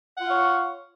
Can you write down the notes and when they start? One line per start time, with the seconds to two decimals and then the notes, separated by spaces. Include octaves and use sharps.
0.18 F#5
0.21 F4
0.25 F5
0.29 C#5